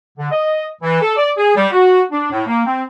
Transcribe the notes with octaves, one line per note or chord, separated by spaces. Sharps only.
D3
D#5
E3
A4
D5
G#4
G3
F#4
D4
A2
A#3
C4